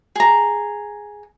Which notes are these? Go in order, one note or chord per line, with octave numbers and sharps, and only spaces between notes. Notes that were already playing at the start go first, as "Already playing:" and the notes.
G#4 A#5